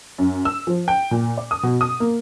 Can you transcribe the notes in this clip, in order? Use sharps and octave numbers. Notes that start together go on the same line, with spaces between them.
F#2
E6
F3
G5
A#2
D5
D#6
B2
D#6
A#3